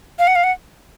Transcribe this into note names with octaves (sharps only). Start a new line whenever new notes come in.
F5
F#5
F5
F#5